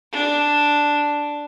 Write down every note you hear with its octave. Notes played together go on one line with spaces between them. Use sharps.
D4